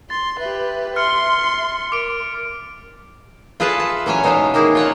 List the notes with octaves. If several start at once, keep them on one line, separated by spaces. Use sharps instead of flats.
C6 A6
G4 B4 E5
C6 F6 C#7
A#4 D6 D7
F4 G#4 A4 B4 E5 A5
A5
E3 F#3 C#4 C#5 G#5
B2 G#3 D#4 E5 F5
D#3 A#3 D#4 E4 G#4
F4 C#5 F#5